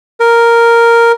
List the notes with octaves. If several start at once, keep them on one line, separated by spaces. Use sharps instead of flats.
A#4